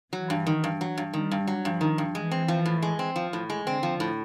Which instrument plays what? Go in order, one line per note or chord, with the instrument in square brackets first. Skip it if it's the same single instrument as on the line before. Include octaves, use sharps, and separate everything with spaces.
[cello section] E3 [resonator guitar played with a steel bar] F#3
[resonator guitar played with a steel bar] G2
D#3
G2
F#3
G2
[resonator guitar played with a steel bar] D#3 [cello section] G3
[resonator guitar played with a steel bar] G2
F#3
[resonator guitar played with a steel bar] G2 [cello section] F3
[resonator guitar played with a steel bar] D#3
G2
[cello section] E3 [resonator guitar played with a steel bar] G#3
[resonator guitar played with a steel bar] C4
F3
A2
G#3
C4
F3
A2
G#3
[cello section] D3 [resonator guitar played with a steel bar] C4
[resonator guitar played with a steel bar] F3
A2